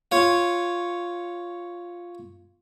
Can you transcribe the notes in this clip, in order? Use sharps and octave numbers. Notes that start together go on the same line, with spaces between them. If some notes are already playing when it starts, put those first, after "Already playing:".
F4 C#5